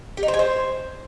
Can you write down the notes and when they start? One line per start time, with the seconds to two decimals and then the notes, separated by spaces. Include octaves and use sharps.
0.17 G4
0.23 D#4
0.28 C5
0.34 G#5
0.39 C5